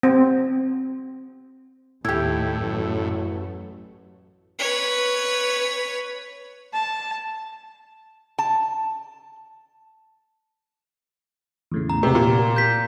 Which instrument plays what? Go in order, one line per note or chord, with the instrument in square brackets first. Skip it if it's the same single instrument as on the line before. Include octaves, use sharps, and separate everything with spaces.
[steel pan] C4
[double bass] D#2 [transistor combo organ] A2 [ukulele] E4 G4
[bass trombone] A1 [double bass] F#2 F#3
[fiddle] B4 C#5
[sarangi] A5
[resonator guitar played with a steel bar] A5
[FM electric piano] E2 A2 C#3
[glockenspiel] A#5
[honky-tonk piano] C3 [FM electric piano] G#3 B3
[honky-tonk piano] A#2 [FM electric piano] G4
[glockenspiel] G6 B6